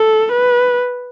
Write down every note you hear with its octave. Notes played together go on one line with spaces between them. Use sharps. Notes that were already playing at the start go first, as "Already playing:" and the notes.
Already playing: A4
B4